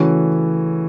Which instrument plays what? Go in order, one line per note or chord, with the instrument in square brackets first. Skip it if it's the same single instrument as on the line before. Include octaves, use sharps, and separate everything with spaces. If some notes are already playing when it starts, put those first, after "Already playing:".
Already playing: [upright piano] C#3 A3 C#4 F#4 A4 [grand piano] E3